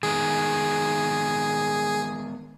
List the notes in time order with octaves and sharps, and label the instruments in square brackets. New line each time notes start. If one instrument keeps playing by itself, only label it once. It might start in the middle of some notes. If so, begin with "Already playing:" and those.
[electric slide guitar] D#3 G#3 B3 [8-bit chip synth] G#4